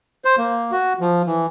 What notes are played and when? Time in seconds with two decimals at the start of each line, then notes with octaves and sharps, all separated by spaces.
0.25 C5
0.38 A#3
0.72 F#4
1.00 F3
1.26 E3